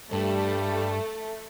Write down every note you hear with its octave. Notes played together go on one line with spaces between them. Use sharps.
G2 G3 A3 G4